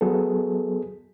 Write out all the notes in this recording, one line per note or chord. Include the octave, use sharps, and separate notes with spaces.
F#3 B3 G#4 A4